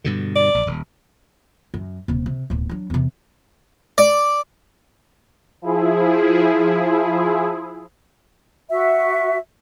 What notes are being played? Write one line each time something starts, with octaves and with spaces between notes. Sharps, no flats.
G2 B2 D3
D5
A#1
D#1
F#2
D#1 C3
C3
D1 B1
F#3 D4
E2 C3
D5
F3 E4 G#4
F#4 E5